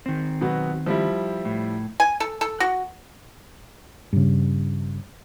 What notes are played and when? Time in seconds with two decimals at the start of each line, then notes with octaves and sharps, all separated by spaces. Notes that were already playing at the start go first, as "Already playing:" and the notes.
0.06 D#3 C4
0.41 B2 F#3 B3
0.86 F3 G3 E4
1.45 A2
2.00 G#5
2.20 A4
2.41 A4
2.60 F#4
4.13 G2 C#3